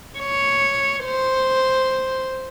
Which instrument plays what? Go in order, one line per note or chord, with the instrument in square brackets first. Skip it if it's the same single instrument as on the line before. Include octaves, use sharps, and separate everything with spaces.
[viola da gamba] C#5
C5